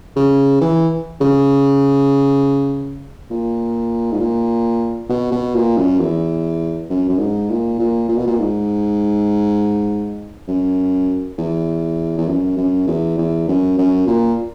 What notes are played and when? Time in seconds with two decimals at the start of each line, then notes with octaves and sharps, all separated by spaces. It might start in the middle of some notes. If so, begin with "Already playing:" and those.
0.16 C#3
0.61 E3
1.21 C#3
3.31 A#2
4.12 G#2
4.20 A#2
5.09 B2
5.32 B2
5.55 A#2
5.77 F#2
6.00 E2
6.90 F#2
7.09 F#2
7.20 G#2
7.50 A#2
7.79 A#2
8.09 A#2
8.18 B2
8.27 A#2
8.40 G#2
10.48 F#2
11.38 E2
12.18 E2
12.28 F#2
12.57 F#2
12.88 E2
13.18 E2
13.48 F#2
13.78 F#2
14.07 A#2